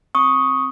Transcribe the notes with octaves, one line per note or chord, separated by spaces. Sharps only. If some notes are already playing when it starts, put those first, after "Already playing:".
C4 C#6 D#6